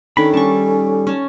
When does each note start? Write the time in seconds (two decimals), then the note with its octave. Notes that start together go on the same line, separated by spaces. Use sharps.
0.17 D#3 C#4 D4 A4 B5
0.34 G3 C#4 A5 C#6
1.07 C#4 A5